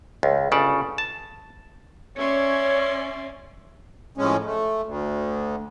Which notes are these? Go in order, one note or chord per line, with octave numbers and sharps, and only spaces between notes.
C#2
G1 C#3 A4 D5
A5
C#4 C#5 D5 E5 C6
F2 A2 G#3 C#4
A3
D2